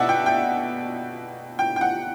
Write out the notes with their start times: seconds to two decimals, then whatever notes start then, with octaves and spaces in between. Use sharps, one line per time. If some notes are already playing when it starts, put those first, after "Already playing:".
Already playing: B2 D5 E5 F#5
0.09 G5
0.26 G5
1.59 G5
1.76 G5
1.81 F#5